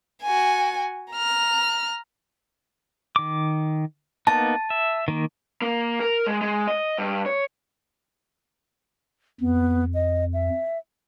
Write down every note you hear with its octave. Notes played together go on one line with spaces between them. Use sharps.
F#4 G#5
A#5 F6
D#3 D6
A#3 B3 D#4 A5
E5
D#3 A#3
A#3
A#4
G#3
G#3
D#5
G2
C#5
F2 B3
D#5
E5